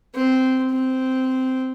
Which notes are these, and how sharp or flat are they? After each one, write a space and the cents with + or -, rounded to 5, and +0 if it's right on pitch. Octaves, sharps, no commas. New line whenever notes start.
C4 -10
C4 -10